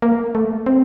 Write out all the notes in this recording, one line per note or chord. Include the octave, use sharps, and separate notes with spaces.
A#3
A3
C4